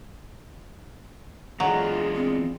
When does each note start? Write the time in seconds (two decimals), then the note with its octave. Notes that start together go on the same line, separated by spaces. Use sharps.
1.60 E3 F#3 B3 D4 F4 G#4 D#5
2.15 C4